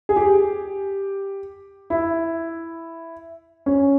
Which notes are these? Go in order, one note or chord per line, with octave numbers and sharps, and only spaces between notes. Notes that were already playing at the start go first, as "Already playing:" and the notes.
G#4
G4
E4
C#4